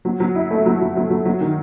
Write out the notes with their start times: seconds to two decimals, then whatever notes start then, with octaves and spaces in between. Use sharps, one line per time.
0.05 F#3
0.20 F#3
0.35 E4
0.51 A3
0.66 F#3
0.81 F#3
0.96 F#3
1.10 F#3
1.25 F#3
1.41 D#3